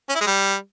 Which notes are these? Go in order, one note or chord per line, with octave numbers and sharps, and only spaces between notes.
C#4
E4
G#3
G3